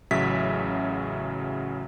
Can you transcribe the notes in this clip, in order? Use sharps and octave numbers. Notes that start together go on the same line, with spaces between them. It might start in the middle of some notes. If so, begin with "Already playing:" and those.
A1 C#3 F#3 E5 B6